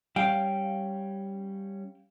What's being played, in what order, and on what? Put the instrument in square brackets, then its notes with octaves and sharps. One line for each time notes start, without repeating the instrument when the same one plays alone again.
[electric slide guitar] G3 C#4 [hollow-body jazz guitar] F5 G5